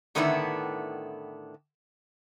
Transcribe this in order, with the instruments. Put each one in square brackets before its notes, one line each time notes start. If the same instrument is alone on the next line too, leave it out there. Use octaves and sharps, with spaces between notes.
[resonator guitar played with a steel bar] A2 D3 D#3 B3 D4 E4